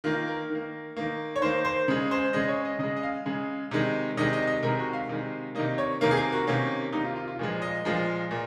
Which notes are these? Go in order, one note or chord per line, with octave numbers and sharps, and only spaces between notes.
D#3 A#3 F4
A#4
D#3
A#3
D#3 A#3
C#5
D#3 A#3 C5
C5
C#3 G#3
C5
C#3 G#3 D#5
C#5
D#5
C#3 G#3 D#5
D#5
F5
C#3 G#3
C3 D#3 G#3
C3 D#3 G#3 D#5
D#5
D#5
C3 D#3 G#3 A#4
F#4
F5
C3 D#3 G#3
C3 D#3 A#3 D#5
C#5
C3 D#3 A#3 A#4
G#4
A#4
F#4
C3 D#3 A#3 C#4
C3 D#3 A#3 D#4
F4
F4
F4
A#2 F3 G#3
D#5
A#2 F3 G#3
A#2